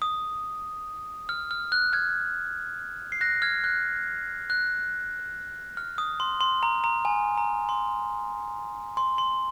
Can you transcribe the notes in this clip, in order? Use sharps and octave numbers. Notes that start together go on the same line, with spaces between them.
D#6
F6
F6
F#6
F6 G#6
C7
F#6 A#6
F6 G#6
F#6
F#6
F6
D#6
C6
C6
A#5
A#5
G#5
A#5
C6
C6
C6